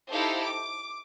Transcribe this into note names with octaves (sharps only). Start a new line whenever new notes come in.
D#4 E4 G4 A4 C5 F5
D6